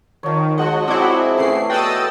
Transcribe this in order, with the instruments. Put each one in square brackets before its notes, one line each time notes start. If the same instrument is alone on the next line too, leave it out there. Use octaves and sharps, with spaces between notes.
[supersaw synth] D#3 [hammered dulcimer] F3 C#5
[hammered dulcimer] F3 G#3 [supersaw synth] F#4 [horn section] D#5 F#5
[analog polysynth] C4 E4 [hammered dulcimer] G#4 C#5 D5
[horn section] A2 C#3 [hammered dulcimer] E3 A3 [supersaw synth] C7
[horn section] B3 B4 G5 [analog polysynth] F#4 D#5 [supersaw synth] D#6 E6 A6